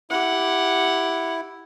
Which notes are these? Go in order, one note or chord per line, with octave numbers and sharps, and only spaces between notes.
E4 G4 F#5